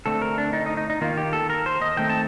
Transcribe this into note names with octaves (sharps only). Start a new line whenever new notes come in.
D3 A3 C4 A4
A#4
D4
D#4
D#4
D#4
D#4
D#3 A#3 F4
G4
A4
A#4
C5
D#5
D#3 A3 C4 G5
A5